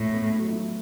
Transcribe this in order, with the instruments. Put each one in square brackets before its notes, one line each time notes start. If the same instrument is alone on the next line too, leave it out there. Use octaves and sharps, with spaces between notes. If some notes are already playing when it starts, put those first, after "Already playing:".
Already playing: [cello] A2
[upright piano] B3
A3
F#3
A2